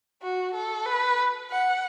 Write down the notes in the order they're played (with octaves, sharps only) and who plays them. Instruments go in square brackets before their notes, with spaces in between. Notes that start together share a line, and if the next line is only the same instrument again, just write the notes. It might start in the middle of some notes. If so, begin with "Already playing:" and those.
[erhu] F#4
A4
B4
F#5